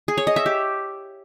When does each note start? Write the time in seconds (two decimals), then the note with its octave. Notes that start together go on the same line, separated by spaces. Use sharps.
0.08 G#4
0.18 C#5
0.27 D#5
0.36 E5
0.46 G4